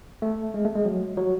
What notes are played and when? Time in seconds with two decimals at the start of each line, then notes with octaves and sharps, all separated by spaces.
0.22 A3
0.54 G#3
0.65 A3
0.75 G#3
0.85 F#3
1.17 F#3